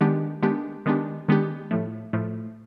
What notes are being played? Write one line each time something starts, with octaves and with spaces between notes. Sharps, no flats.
D#3 G#3 B3 D4 G4
D#3 G#3 B3 D4 G4
D#3 G#3 B3 D4 G4
D#3 G#3 B3 D4 G4
A2 F3 A3
A2 F3 A3